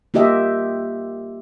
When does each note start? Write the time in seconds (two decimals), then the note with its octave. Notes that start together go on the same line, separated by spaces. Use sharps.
0.14 A#3 F4 G4 D#5 E5